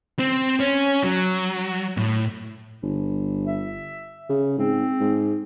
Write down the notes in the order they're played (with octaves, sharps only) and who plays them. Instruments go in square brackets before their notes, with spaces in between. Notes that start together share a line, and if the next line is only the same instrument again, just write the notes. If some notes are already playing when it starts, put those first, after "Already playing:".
[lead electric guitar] C4
C#4
F#3
A2
[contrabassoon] G1
[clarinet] E5
[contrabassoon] C#3
[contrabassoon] G#2 [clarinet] C4
[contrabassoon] G#2